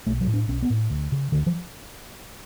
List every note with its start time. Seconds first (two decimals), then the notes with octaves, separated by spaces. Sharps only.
0.07 B1 A3
0.21 F#3
0.27 A2
0.34 D4
0.48 B1 C#4
0.62 B3
0.70 A2
0.90 D2
1.12 C#3
1.32 D2 D3
1.46 F3